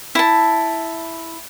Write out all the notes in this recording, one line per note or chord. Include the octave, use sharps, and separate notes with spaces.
E4 A5